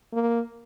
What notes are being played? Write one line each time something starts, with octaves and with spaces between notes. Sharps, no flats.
A#3